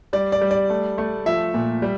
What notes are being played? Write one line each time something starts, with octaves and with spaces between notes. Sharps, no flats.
G3 D5
D5
G3
D5
A3
A3
F3 E5
A#2
G3